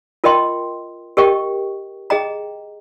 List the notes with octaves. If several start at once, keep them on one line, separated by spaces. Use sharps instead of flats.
F4 A#4 D#5 G5 C6
G4 A#4 D#5 G5 C#6
G#4 D#5 G5 A#5